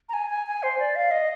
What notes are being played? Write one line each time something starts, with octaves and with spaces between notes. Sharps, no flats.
A#5
G#5
G#5
G#5
C5
D5
F5
D#5